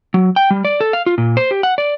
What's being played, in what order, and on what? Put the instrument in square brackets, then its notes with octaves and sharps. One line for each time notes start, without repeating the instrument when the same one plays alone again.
[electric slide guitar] F#3
G5
G3
D5
A4
F5
F4
A#2
C5
G4
F#5
D5